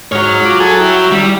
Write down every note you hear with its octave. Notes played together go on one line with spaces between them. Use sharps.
G#2 F#4 C#5 F6
F4 D6
G#4 A4 G#5
E4 G5
G3